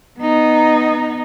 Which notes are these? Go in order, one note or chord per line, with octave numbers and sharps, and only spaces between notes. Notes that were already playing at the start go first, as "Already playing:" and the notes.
B3 D#4